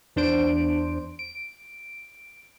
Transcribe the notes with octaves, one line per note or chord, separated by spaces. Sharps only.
E2 D4 C5 D7
D7